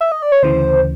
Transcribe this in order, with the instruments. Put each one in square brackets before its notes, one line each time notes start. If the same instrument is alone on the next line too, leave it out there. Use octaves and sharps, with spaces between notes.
[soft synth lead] E5
D#5
D5
C#5
[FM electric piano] D2 C#3 E3 [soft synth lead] C5